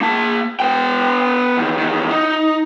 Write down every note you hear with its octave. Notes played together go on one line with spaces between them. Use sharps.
A#3 A5
B3 G5
E2 D#3
E2 D#3
D#4